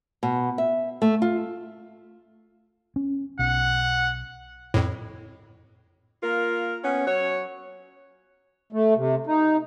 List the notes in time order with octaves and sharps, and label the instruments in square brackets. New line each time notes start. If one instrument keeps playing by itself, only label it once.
[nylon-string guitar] B2
E5
A3
F4
[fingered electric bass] C#4
[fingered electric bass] B1 [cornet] F#5
[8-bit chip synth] F2 A2
[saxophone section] A#3 F4 A#4
B3 C#4
F#3 C#5
[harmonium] A3
C3
D#4